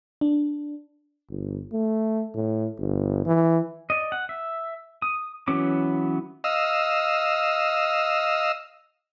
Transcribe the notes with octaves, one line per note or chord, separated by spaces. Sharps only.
D4
G1
A3
A2
G1
E3
D5 D#5
F#5
E5
D#6
E3 F#3 B3 C#4 D6
D#5 F5 E6